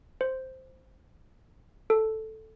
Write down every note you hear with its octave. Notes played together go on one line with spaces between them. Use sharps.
C5
A4